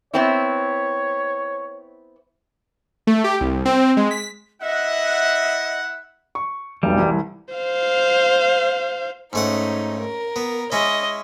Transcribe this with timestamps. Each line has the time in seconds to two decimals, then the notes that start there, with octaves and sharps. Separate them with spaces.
0.14 B3 C4 E4 C#5
3.07 A3
3.24 G4
3.41 C2
3.65 C4
3.97 G#3
4.11 B6
4.61 E4 D#5 E5 F#5
6.35 C#6
6.83 F1 B1 G3
6.97 C2 E3
7.55 C5 F5
9.33 G#2 A3 C#4 D#4 F#5
10.00 A#4
10.36 B3
10.72 G#3 C#4 E4 D#5